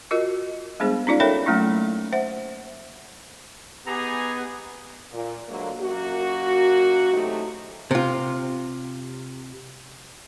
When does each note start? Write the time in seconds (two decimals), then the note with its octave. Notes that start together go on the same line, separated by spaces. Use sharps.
0.11 F4 F#4 A#4 D#5
0.80 G3 G#3 B3 D4 G#4 C5
1.07 C#4 D#4 F4 D5 F5
1.20 A4 A#4 C#5 E5 G5 B5
1.46 F#3 A3 A#3 C#4 E4
2.13 C5 E5 F#5
3.86 B3 D#4 G4 G#4 A#5
5.13 A#2
5.48 D2 D3 F#3 G#3 A#3
5.81 F#2 A#2 A#3 F#4
7.13 C3 E3 F#3 A3 D#4 G4
7.91 C3 F4